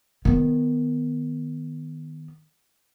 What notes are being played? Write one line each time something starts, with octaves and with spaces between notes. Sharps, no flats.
D#3 B3